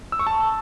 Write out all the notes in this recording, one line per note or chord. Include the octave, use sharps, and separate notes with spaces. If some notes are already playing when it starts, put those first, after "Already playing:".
E6
C#6
A5